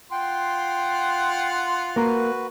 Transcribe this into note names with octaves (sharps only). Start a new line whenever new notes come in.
F4 F#5 G5 C6
A#3 F#4 A#4 B4